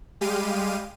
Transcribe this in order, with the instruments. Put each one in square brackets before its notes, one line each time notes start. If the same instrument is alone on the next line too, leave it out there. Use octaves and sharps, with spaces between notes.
[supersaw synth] G3 G#3 G4 F5 D#7